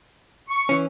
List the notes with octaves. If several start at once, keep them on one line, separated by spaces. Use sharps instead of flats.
C#6
E3 C#4